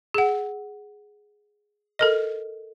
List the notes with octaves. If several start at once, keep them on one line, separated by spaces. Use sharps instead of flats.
G#4 F#5
A4 A#4 D#5